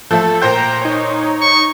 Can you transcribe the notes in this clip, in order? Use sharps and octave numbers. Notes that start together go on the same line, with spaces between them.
F3 A3 A4
A#2 C5 G5 A#5 G6
D#4 C#5
C#6